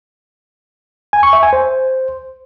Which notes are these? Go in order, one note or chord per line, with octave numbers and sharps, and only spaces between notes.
G#5
C#6
E5
G#5
C5